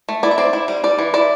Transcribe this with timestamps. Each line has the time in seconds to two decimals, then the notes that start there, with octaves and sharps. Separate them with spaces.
0.09 A3
0.23 E4 D5
0.31 E5
0.38 C4 D5
0.53 E4
0.68 G3
0.84 G3 D5
0.99 E3
1.14 E4 D5